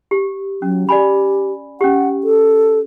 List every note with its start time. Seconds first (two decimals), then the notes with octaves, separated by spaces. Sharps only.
0.11 G4
0.62 F#3 C#4
0.89 G4 D5 G#5 B5
1.81 C#4 G4 F#5
2.24 A4